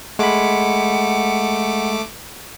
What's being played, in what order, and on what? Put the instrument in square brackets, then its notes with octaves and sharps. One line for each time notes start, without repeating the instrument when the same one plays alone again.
[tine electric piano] G#3 B5 [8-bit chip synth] A3 D6 [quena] F#5